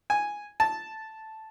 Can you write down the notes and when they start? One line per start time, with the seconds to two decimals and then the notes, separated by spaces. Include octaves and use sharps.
0.10 G#5
0.60 A5